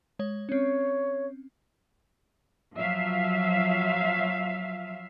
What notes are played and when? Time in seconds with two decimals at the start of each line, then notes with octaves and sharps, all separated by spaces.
0.19 G#3 C#5
0.49 C4 C#4 C#5
2.77 F3 F#3 E5 F5